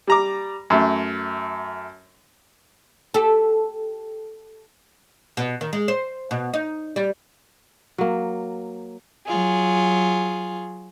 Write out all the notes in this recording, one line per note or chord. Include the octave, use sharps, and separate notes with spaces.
G3 A#5 D6
F#2 A3
G4 A4
B2
D#3
G#3
C5
B2
D#4
G3
F#3 A#3
F#3 F4 G#4